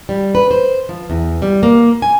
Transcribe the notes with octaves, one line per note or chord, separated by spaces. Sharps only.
G3
B4
C5
F3
E2
G3
A#3
G#5